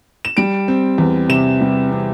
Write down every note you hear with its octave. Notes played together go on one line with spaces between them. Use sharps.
E7
G3 D7
C4
E2
C3 E7
G3
C4